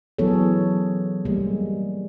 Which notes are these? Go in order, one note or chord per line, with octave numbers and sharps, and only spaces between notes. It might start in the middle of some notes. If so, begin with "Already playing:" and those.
E3 F#3 B3 G#4 A4 C#5
G3 G#3 A#3